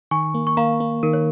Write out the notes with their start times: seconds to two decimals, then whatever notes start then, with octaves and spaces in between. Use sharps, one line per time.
0.11 D#3 G#5 C#6
0.34 A#3
0.47 C#6
0.57 A#3 F5 A#5
0.80 A#3
1.03 D#3 A#4
1.13 C#5